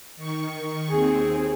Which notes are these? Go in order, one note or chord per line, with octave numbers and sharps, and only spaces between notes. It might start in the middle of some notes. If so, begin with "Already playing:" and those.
D#3 C#6
D#2 C4 G#4